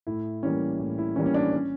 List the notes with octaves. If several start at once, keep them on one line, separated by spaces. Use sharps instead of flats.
A2 E4
E3 G3 A#3 C#4
A2
E4
E3 G3 A#3 C#4
C#4
D4
C#4